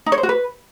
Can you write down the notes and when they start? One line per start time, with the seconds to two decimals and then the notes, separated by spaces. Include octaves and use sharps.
0.06 D#4
0.12 C#5
0.18 C5
0.23 F#4
0.29 B4